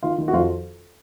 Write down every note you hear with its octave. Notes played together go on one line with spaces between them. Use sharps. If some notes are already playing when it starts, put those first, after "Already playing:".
D#3 F4
D#3
F#4
F2 F4